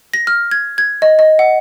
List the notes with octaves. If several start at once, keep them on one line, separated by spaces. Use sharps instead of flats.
A#6
F6
G#6
G#6
D#5
D#5
F#5